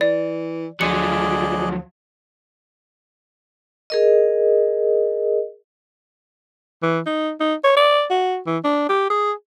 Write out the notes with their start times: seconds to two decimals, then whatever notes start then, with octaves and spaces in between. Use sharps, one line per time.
0.01 E3 D5
0.81 D2 F3 F#3 G#4 D5 D#5 C#7
3.90 G#4 A#4 D#5
6.83 E3
7.06 D#4
7.40 D#4
7.64 C#5
7.77 D5
8.10 F#4
8.47 E3
8.64 D4
8.89 G4
9.10 G#4